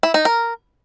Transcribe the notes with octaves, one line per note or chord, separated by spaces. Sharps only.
E4
D#4
A#4